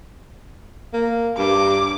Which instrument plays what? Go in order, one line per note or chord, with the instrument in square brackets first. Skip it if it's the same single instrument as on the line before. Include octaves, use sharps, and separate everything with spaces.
[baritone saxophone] A#3
[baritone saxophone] G2 [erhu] D6